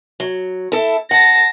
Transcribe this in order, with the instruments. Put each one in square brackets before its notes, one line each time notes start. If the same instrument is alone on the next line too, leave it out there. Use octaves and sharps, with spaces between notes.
[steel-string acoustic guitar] F#3
E4 A4
[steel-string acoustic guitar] F#5 [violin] A5 A#6